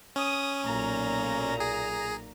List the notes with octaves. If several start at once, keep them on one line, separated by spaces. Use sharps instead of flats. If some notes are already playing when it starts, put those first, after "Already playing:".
C#4 D#6
B1 A#2 A#5
G#4